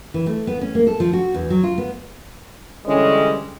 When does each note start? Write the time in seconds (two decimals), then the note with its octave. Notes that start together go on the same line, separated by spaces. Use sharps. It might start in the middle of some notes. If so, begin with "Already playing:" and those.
0.14 E3
0.26 A3
0.47 B3
0.61 C#4
0.75 A#3
0.87 A4
1.00 F3
1.13 F#4
1.34 E2
1.50 F#3
1.63 F4
1.78 B3
2.86 D3 E3 G3 G#3 C#4